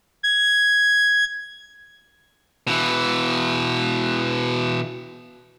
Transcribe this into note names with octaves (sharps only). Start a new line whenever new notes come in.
G#6
B2 E3